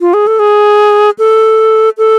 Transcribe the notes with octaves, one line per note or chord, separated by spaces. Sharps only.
F4
G#4
A4
G#4
A4
A4